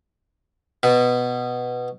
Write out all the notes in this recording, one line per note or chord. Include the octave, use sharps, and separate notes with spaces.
B2